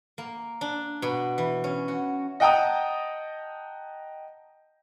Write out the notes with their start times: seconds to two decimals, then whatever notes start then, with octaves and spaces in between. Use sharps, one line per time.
0.18 A#3
0.61 D4
1.02 B2
1.38 E3
1.64 C#4
1.88 F#4
2.40 D#5 F#5 G5 A5 A#5 D#6